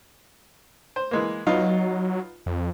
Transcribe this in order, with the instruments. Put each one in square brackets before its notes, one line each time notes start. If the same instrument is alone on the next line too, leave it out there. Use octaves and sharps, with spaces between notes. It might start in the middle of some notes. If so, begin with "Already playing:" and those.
[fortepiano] C5
E3 G#3 A#3
[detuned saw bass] F#3 [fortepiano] B3 D#4 F4
[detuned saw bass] F2